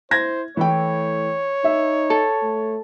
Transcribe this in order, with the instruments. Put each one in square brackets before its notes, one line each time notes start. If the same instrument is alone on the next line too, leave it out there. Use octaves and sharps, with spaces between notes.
[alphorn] E4 [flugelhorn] C5 [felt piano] G#6 A#6
[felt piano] E3 E4 G5 [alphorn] A3 [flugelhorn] C#5
[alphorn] D#4 [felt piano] E5
[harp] A4
[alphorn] A3